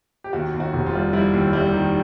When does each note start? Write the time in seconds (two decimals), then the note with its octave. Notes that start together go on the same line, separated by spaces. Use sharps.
0.24 G4
0.33 D#2 F#4
0.54 D#2
0.60 F#4
0.73 F1
0.86 F4
0.93 G3
1.13 G3 E4
1.33 D#2
1.53 G3
1.73 D#3